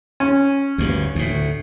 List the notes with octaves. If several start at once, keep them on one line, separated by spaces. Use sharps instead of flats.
C#4
D2 G2
D2 A2